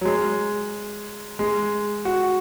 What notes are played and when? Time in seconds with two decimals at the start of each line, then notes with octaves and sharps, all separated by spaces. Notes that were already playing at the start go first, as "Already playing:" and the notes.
0.01 F#3
0.05 G#3
1.39 G#3
2.05 F#4